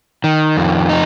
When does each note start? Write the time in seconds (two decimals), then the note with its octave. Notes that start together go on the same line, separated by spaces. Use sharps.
0.24 D#3
0.57 F2
0.89 D#4